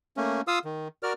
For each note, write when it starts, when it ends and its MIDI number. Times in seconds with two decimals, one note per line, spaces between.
0.17 0.41 57
0.17 0.41 58
0.17 0.41 61
0.48 0.59 65
0.48 0.59 77
0.48 0.59 87
0.48 0.59 88
0.65 0.88 51
1.03 1.13 66
1.03 1.13 70
1.03 1.13 74
1.03 1.13 89